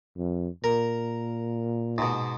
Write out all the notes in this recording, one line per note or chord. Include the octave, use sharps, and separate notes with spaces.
F2
A#2 A#4
G#2 B2